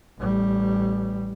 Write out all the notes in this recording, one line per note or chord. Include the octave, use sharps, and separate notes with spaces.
A1 G3